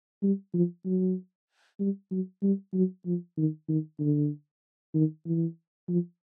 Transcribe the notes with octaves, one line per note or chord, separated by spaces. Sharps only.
G3
F3
F#3
G3
F#3
G3
F#3
F3
D#3
D#3
D3
D#3
E3
F3